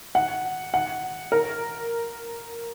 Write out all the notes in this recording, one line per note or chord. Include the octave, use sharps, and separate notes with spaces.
F#5
F#5
A#4